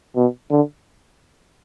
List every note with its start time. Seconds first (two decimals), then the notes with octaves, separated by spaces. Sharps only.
0.16 B2
0.51 D3